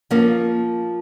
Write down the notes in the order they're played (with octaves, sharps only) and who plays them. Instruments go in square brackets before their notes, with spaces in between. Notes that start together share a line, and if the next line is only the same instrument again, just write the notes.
[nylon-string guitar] F3 A#3 C#4